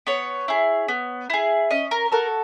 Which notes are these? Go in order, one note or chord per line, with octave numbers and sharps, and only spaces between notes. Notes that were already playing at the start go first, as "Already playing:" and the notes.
B3 C#5
E4 G#4
B3
E4 G#4
C#4 D#5
A#4
F#4 A4 A#4